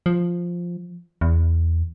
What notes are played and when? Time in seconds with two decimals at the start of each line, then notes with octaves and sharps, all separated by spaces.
0.06 F3
1.21 E2